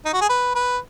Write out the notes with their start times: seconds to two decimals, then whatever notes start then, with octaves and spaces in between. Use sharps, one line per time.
0.05 D#4
0.13 F#4
0.21 G#4
0.29 B4
0.55 B4